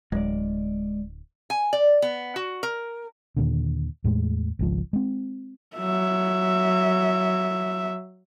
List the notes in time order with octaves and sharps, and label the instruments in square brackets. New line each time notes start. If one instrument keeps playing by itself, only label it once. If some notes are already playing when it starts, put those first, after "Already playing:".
[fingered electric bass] D1 [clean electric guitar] G#3 D5
[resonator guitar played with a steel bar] G#5
D5
B3
F#4
A#4
[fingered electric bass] D#2 A#2 D3
E2 A2 G#3
G#1 C#2 F3
G#3 C4
[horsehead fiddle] F#3 E5